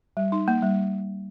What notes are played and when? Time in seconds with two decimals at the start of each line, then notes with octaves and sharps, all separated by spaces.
0.17 G3
0.32 D#4
0.48 A#3
0.62 G3